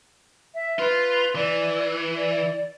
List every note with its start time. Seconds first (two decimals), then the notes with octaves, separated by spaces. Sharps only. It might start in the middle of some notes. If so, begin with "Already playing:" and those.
0.54 E5
0.79 F4 B4
1.35 E3 D5
2.17 D5